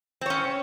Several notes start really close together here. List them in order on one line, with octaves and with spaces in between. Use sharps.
C4 C#5 C#4